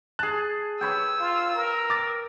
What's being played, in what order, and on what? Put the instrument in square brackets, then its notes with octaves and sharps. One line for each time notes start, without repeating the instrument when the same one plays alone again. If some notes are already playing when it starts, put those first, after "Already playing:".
[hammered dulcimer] G#4 A5 [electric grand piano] F#6
[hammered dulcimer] B4 C#5 G5 [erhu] E6
[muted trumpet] F4
A#4
[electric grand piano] D6 A6